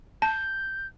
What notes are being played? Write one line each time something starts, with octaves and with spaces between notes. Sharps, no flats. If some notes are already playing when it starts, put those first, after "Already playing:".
A5 G6